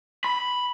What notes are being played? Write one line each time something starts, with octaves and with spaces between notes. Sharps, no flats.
B5